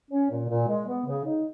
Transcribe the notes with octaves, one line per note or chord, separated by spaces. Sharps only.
C#4
A#2
A#2
G#3
B3
C#3
D#4